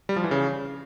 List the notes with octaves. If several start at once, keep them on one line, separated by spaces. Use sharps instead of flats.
G3
F3
E3
C#3